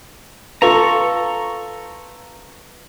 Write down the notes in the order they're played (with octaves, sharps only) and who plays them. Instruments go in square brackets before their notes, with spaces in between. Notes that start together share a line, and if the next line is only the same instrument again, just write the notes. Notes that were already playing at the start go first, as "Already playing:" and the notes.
[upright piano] F4 [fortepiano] A4 [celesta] B4 [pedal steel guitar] A#5 C#6